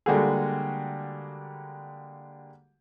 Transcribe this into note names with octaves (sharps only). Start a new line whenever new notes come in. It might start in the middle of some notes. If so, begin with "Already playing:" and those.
D3 G3 G#3 A#3 F#4 G#4